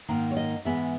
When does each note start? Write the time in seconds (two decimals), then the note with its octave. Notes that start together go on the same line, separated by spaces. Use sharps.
0.09 G#2 D#3 A#3
0.31 C#5
0.37 D#5
0.65 G#2 E3 G#3 B3 E5